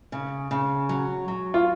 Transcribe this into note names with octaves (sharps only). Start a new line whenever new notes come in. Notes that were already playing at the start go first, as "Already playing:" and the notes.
C#3
C#3
F#3
F#3
F4